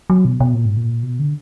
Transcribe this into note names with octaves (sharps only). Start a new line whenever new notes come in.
F#3
B2
B2
A#2
G#2
A#2
B2
D3